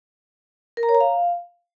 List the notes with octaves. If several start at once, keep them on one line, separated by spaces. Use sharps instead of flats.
A#4
A#5
C#5
A#5
F5